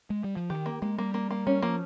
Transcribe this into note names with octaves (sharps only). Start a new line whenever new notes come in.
G#3
G3
F3
D#3 G4
A#3
G#3 A#3
G3 A#3
A#3
A#3
G3 C#4
F3 A#3